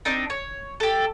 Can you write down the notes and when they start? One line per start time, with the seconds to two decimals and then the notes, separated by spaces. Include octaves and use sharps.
0.05 C4 D4 D#4
0.30 C#5
0.80 G4 A4